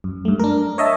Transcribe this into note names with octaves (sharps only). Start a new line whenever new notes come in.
F#2
G2 A3
D4 A#4
C#5 D#5 E5 A5